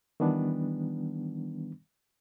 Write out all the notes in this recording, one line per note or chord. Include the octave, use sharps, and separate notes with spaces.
D#3 E3 G3 B3 D4